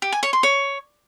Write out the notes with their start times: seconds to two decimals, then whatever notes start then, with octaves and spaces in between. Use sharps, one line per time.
0.02 G4
0.12 G#5
0.23 C#5
0.33 C6
0.43 C#5